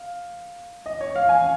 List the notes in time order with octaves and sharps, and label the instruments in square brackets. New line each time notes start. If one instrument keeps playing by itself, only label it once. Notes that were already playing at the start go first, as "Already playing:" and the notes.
Already playing: [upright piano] F5
D#5
C#5
F5
G#5